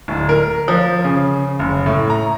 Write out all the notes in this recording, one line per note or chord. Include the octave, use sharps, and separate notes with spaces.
D1
A#4
F3
C#3
F#1
A2
A#5